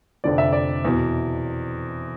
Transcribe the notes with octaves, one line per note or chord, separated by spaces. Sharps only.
F1 F2 D3 F3 D5
E5
D5
E2 B2